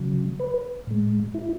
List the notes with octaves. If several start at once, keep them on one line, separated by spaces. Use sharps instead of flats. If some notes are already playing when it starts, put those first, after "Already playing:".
Already playing: C#3 F#3
B4
A2 G#3
E4